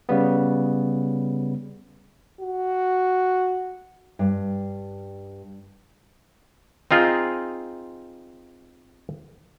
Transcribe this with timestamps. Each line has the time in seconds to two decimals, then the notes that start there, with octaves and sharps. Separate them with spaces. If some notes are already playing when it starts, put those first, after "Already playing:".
0.09 C#3 G3 B3
2.41 F#4
4.19 G2
6.91 C4 D#4 F4 G#4